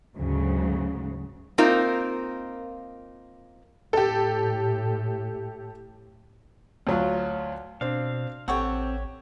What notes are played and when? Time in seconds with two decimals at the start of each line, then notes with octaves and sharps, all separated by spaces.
0.16 D2 G#2 C#3 F#3
1.58 A#3 C4 D#4 F4 A#4
3.93 A2 G4 A4
6.87 D2 F#3 F4
7.81 B2 C4 D4 F5
8.48 A1 C4 G4 A4 C#5 F#5